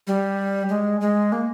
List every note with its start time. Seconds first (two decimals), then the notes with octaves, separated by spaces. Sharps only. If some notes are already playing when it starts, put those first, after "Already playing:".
0.07 G3
0.69 G#3
1.01 G#3
1.32 A#3